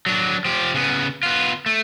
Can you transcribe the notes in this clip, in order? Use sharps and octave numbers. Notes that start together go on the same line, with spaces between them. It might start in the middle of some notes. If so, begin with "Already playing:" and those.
F#3 D4
F3 G4
C#3 B3
B3 F4
A3